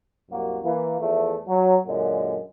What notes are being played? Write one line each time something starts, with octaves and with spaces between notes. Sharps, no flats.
C2 F#2 A#3 F#4
E3 A#3
E2 F3 A3
F#3
F#2 A#2 D3 G#3